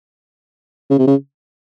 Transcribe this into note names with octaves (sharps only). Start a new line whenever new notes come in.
C#3
C3
C#3